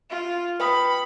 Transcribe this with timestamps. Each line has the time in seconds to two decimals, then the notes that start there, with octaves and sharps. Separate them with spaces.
0.10 F4
0.60 B4 G5 B5 D#6